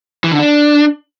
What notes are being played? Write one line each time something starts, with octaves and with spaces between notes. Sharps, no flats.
E3
D3
D4